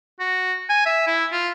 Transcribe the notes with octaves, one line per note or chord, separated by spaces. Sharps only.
F#4
G#5
E5
E4
F4